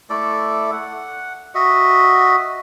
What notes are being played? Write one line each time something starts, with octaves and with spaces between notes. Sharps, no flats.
A3 E4 A4 D5
F#5
F#4 D#5 E5